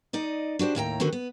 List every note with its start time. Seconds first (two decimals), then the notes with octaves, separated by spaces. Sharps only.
0.13 D#4 D5 D#5
0.59 D4 F#4 G4 C5
0.75 D#2 A2 G5 A#5
1.00 D3 D#3 B3 C4 F#4
1.13 B3